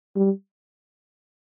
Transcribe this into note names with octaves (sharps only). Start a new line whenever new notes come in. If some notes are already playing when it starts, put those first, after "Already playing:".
G3